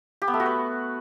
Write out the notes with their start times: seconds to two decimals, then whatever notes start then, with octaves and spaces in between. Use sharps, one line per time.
0.22 G4
0.28 B3
0.34 A3
0.40 F#4
0.46 B4